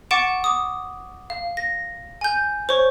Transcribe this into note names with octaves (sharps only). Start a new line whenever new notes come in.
F#5 C#6 D6 A6 D7 E7
D6 D#6
F5
A#6
G#5 G6
C5 C#5 C#6